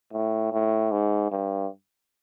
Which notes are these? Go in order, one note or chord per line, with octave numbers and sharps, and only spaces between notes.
A2
A2
G#2
G2